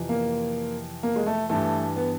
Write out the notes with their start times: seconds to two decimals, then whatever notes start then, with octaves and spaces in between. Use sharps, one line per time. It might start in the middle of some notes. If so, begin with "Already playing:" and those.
Already playing: F2 C3 E3
0.09 A#3
1.03 A#3
1.16 G#3
1.26 A3
1.49 G2 E3 A3
1.96 B3